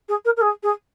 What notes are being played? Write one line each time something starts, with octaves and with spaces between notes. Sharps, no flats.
G#4
A#4
A#4
G#4
G#4